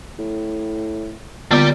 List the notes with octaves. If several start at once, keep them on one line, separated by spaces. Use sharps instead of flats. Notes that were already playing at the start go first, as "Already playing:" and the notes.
A2
A#2 D3 G3 B3 D5